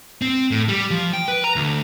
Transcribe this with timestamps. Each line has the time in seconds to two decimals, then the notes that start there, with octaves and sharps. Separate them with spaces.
0.22 C4
0.51 A2
0.68 G3
0.91 F3
1.13 G5
1.28 B4
1.44 A#5
1.56 D2